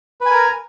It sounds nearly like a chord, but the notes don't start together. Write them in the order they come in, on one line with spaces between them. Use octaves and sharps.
B4 G#5 A#4 A#5